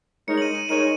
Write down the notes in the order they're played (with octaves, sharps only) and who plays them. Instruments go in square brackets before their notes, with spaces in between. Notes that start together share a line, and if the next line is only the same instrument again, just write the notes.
[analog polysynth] G#3 D#4 A#4 C#5 [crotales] C#7
[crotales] F#7
D#7
D#7
[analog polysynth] G#3 D#4 A#4 C#5 [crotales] D#7